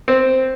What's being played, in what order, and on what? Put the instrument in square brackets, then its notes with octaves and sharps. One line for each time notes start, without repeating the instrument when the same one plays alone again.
[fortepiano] C4